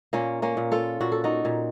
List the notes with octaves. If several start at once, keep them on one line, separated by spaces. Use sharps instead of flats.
A#2 A#3 C#4
A#3 C#4
A#2
F4 A4
A#2 F#4
A4
D#4 F#4
A#2